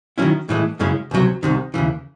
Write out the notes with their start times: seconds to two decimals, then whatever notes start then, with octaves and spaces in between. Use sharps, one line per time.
0.18 D#3 F#3 C#4 E4
0.49 A2 E3 G#3
0.79 F#2 C#3 G#3 C#4 E4
1.11 C#2 C3 F#3
1.43 C2 C3 D#3
1.74 D#2 C#3 E3